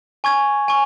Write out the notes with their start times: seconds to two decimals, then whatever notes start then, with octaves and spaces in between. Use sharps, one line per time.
0.24 G#5 C#6 G#6
0.68 G#5 C#6